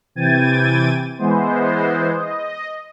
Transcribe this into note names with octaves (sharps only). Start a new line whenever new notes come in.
C3 E3 G5 G#6 A6 D#7
E3 G#3 B3 C5
D#5